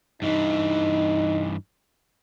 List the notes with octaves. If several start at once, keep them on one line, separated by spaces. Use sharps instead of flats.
G2 E3 D#4